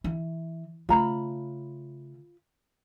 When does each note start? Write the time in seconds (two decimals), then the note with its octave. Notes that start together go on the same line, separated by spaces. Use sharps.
0.04 E3
0.89 C#3 A3 F4 A#5 B5